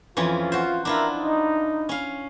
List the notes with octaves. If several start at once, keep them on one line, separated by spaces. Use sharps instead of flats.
F2 E3 C#4 F4
F#4 C5
D4 E4 F4 A#4 E5 A#5
D#4
C#4 F5